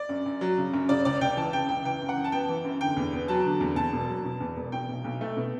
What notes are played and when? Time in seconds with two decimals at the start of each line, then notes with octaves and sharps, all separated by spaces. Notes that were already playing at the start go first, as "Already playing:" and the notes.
Already playing: D5
0.09 F#2
0.26 F#2
0.41 F#3
0.58 C#3
0.73 F#2
0.89 C#3 D5
1.05 C#2 D5
1.21 C#2 G5
1.37 E3 A5
1.53 C#3 G5
1.69 C#2 G5
1.84 E3 G5
2.02 F#2
2.09 F#5
2.17 F#2
2.24 A5
2.32 B3 G5
2.49 E3
2.64 F#2
2.81 D3 G5
2.97 E2
3.12 B3
3.28 F#3 A5
3.45 D3
3.61 E2
3.76 E2 A5
3.93 E1
4.09 F#3
4.25 B2
4.40 E2
4.57 E1
4.72 B2 G5
4.89 B1
5.04 B1
5.21 A3
5.36 B2